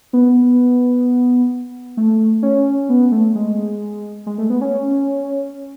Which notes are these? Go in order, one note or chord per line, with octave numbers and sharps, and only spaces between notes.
B3
A3
C#4
B3
A3
G#3
G#3
A3
B3
C#4